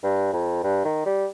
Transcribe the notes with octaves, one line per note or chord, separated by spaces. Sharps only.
G2
F2
G2
D#3
G3